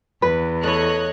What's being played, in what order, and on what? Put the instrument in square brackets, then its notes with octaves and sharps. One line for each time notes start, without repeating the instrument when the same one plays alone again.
[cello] E2 [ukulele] B4
[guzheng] A3 E4 [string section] C#5 D#5 F#6